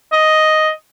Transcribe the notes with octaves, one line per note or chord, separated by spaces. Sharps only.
D#5